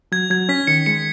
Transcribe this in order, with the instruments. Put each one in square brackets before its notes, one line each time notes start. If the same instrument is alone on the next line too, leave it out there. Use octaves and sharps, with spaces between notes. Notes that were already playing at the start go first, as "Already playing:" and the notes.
[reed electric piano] F#3 [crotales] G#6
[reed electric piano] F#3 [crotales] G#6
[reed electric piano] C#4 [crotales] B6
[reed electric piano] D#3 [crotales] C#7
[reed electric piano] G#3 [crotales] C#7